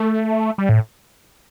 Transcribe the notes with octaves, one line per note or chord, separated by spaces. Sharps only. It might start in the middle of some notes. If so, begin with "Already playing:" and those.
Already playing: A3
G3
A2